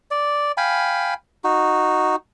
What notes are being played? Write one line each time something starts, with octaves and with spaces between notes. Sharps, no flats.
D5
F5 G5 G#5 B5
D#4 F#4